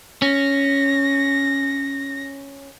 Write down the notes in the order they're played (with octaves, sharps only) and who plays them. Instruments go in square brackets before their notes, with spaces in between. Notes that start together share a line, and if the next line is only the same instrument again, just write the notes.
[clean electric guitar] C#4 [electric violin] A#6